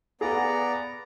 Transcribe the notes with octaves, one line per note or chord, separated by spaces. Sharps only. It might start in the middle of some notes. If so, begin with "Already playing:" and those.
B3 G#4 D5 F5 F#5 A#5